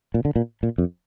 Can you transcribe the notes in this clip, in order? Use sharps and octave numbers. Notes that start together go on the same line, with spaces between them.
A#2
D3
A#2
A#2
F2